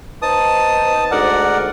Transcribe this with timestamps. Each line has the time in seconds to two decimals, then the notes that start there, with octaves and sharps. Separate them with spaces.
0.22 B3 D#4 C5 A5 D#6
1.11 D2 G#2 A#4 D5 F#5